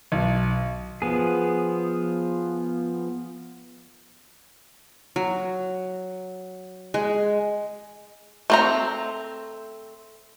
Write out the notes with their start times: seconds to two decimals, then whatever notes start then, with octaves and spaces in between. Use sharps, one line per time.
0.12 B1
1.02 F3 B3 G#4
5.16 F#3
6.94 G#3
8.50 A3 C4 A#5